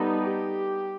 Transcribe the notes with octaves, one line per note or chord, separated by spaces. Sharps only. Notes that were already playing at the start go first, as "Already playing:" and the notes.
Already playing: G3 B3 D#4 A4
G4